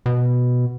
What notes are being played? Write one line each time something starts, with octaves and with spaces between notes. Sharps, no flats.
B2